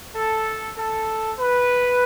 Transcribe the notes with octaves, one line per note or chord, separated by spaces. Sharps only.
A4
A4
B4